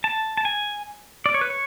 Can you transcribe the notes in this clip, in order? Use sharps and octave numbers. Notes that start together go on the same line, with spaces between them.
A5
A5
G#5
D5
C#5
B4
C#5